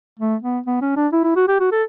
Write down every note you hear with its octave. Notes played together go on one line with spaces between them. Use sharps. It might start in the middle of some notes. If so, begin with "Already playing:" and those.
A3
B3
B3
C#4
D4
E4
E4
F#4
G4
F#4
A4